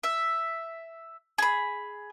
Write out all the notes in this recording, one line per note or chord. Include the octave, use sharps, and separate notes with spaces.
E5
G#4 B5